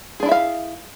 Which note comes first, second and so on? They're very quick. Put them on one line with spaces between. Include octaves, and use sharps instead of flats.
G#4 D4 E4 E5 F5